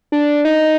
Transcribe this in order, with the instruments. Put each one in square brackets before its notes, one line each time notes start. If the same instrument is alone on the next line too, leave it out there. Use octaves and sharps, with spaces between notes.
[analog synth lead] D4
D#4